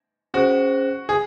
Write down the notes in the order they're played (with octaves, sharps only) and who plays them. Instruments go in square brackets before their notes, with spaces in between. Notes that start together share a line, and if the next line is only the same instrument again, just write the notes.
[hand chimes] C#4 G#4 C5 [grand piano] F#4
[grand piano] G#4